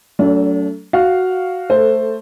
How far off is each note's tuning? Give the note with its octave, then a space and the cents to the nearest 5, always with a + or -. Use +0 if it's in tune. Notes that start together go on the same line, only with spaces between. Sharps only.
F#3 +25 A3 +15 D4 -40
F#4 +0 F5 +0
A3 +5 A4 +20 C5 +0